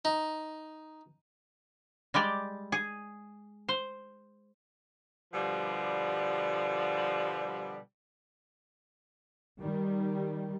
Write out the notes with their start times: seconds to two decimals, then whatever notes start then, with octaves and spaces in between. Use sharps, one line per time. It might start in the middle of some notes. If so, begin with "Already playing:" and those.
0.05 D#4
2.14 G3 G#3 G4 D5
2.72 G#4
3.69 C5
5.34 B2 D3 F3 G3
9.60 D#3 G3